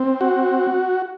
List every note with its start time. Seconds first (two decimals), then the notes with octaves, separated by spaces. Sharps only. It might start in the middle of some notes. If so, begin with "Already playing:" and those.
Already playing: C4
0.21 F#4